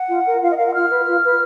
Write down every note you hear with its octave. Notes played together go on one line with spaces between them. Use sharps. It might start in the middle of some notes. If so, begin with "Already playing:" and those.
Already playing: F#5
F4
A#4
F4 F5
D#5
A#4 F5
F#5
F4 F6
B4
F4
B4